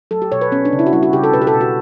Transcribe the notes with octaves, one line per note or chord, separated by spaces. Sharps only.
F#3 A4
G4
B2 C#5
B4
B3 C#4
D4
C#3
E4
F#4
G3 E4
F#4
C#3 G4
A4
B2 B4
G4
A4
B2
F#4